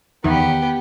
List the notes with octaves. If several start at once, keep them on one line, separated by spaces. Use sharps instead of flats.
E2 D#3 B3 G4